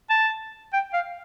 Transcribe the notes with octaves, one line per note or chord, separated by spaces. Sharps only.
A5
G5
F5